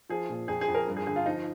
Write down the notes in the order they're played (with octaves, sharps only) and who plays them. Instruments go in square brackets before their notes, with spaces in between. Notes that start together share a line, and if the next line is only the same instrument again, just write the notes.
[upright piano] F3 G#4
A#2
F2 G#4
G#4
F2
A#4
G2
G#4
D3 G#4
F4
F3 D#4